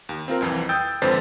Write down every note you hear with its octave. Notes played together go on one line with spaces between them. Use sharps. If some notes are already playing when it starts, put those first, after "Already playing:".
D#2
C4 F4 A#4
C2 F2 E3
G5 D#6 E6 G6 A6
G#1 F2 D3 B4 C5 A6